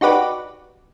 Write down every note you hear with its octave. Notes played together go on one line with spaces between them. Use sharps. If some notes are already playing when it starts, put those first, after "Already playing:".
D#4 F#4 G4 B4 D5